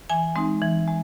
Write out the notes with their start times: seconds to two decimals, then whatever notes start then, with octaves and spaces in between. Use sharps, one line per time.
0.10 E3 G#5
0.36 G#3 C4 D#4
0.62 E3
0.88 G#3